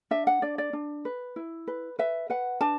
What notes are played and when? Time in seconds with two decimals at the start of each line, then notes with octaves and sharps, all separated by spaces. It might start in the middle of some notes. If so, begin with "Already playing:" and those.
0.11 D4 E5
0.27 F#5
0.42 D4 D5
0.58 D5
0.73 D4
1.05 B4
1.36 E4
1.67 B4
1.99 B4 E5
2.30 B4 F#5
2.61 D4 A5